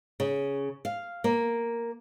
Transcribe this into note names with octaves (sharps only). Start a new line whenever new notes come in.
C#3
F5
A#3